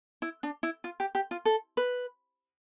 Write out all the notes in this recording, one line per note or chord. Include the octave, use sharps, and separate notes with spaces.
E4
D4
E4
F4
G4
G4
F4
A4
B4